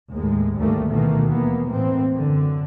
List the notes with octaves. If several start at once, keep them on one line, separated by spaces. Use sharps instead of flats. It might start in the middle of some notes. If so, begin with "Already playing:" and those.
D#2 A2 G#3
D2 G#2 D#3 G3 A3 A#3
B2 D#3 E3 A3 A#3
D#2 E3 A#3 B3
A2 E3 A#3 C4
F#2 D3